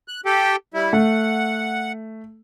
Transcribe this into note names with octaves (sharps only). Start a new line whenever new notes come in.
F#6
G4 A4 G5
G3 E4
A3 F#5